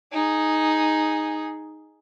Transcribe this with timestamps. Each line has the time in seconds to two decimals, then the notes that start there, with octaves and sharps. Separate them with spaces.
0.12 D#4 G#4